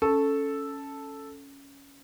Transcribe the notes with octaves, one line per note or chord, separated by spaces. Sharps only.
C#4 A4